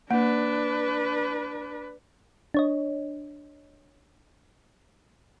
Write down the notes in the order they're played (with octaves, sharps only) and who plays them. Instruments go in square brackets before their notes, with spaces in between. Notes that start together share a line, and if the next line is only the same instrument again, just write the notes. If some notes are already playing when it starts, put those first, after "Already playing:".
[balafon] A#3 [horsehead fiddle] D4 B4
[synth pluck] D4 C#5 D#5